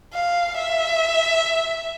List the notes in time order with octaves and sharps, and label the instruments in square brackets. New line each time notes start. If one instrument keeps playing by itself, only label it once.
[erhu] F5
E5